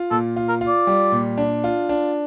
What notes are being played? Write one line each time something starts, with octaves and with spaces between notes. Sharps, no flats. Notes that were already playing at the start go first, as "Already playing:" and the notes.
Already playing: F4
A#2 A4
F4
A#4
F4
D5
G3
A#2
D4
F4
D4